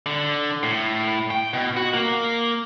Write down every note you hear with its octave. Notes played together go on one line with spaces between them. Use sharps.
D3
A2
G5
B2
F#4
A#3